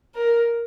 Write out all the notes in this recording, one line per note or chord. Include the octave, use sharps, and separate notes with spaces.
A#4